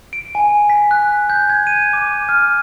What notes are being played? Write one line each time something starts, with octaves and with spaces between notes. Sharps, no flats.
D7
G#5
B6
F#6
G6
G#6
D#7
D6
F6